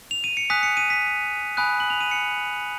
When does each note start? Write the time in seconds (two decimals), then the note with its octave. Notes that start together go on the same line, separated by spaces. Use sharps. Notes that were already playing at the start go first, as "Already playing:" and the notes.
0.11 F7
0.24 D#7
0.37 C#7
0.50 G#5 D#6 F#6 B6
0.63 C#7
0.77 D#7
0.90 B6
1.57 G#5 B5 D#6 F#6
1.80 F#7
1.90 F7
2.01 D#7
2.11 C#7